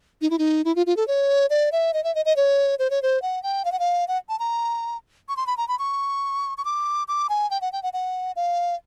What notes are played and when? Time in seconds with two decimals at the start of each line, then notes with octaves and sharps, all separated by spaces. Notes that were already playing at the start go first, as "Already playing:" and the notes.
0.22 D#4
0.30 E4
0.39 D#4
0.65 E4
0.76 F4
0.86 F4
0.97 A4
1.08 C#5
1.50 D5
1.72 E5
1.94 D#5
2.04 E5
2.15 D#5
2.25 D#5
2.36 C#5
2.79 C5
2.90 C#5
3.02 C5
3.22 F#5
3.43 G5
3.65 F5
3.72 F#5
3.79 F5
4.08 F#5
4.29 A5
4.39 A#5
5.29 C#6
5.37 C6
5.47 B5
5.57 A#5
5.68 B5
5.79 C#6
6.58 C#6
6.65 D6
7.08 D6
7.29 G#5
7.51 G5
7.62 F#5
7.73 G5
7.83 F#5
7.93 F#5
8.36 F5